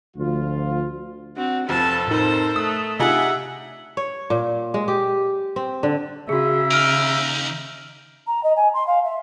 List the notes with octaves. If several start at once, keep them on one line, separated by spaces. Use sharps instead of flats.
D2 F3 F4
C4 D4 F#4
F1 F2 A4 A5
A2 D#4 A#4 C5
A3 D#6 F#6 B6
C3 D4 D#4 F4 G4 G#4 E5 F#5
C#5
A#2
G#3
G4
C4
D3
C#3 F#4 G#4 E5
D#2 D#4 F6 D7
A#5
D#5
G#5
C6
F5
E5